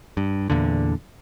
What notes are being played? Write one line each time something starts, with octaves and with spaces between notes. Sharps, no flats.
G2
E2 A#2 D3